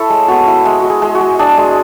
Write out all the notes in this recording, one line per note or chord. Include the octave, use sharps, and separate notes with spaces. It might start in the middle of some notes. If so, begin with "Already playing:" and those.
Already playing: E4 A4 C#5
G#3
B3 F#4 A4
E4
G#3
G#3 F#4
G#4
G#3
F#4
G#3
D4 G#4
G#3